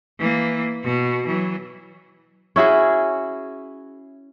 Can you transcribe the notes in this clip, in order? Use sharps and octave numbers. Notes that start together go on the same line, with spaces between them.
E3 A#3
B2 F#4
E3 F#3
C#4 E4 F#4 G#4